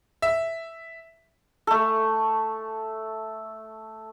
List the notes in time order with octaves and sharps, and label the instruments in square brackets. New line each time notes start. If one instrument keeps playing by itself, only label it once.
[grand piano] E5
[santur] A3 A4